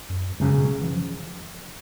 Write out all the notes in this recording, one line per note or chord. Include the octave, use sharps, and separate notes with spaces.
F#2
C#2 F#2 C#3 F#3
B2
E3
F3